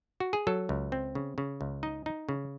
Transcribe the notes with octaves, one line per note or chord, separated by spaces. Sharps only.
F#4
G#4
F#3 A4
C#2
C4
C#3
C#3
C#2
D#4 D#5
D#4
C#3